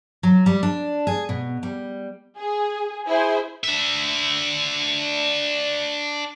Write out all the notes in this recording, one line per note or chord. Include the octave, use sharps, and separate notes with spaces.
F#3
G3
D4
G#4
B2
G3
G#4
E4 G#4 C5
D4 E5